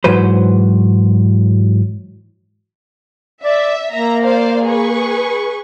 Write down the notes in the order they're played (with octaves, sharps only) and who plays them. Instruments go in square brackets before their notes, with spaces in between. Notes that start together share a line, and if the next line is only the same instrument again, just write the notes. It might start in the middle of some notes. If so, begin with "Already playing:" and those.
[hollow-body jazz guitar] G#2 E3 F#3 B4 C5
[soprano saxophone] D5 [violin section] E5
[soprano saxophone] A#3 [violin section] E5 A#5
[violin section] C5 D5 F5
G#4 B4 C#6